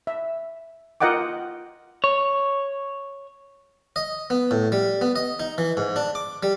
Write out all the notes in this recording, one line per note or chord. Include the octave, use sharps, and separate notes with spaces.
E5
F4 A#4 D#5 F#5 G5 D6
C#5
D#5
B3
A2
G3
B3
D#5
D#4
E3
G#2
D4
D6
G3